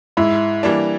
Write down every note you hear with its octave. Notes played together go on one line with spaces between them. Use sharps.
G#2 E4
E3 G3 A#3 D4